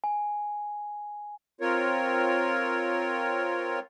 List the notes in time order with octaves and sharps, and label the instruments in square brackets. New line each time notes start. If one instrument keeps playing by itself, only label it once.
[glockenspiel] G#5
[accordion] C4 F4 A#4 C#5